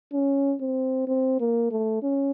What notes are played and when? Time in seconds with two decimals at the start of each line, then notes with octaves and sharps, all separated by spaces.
0.13 C#4
0.61 C4
1.07 C4
1.40 A#3
1.71 A3
2.02 C#4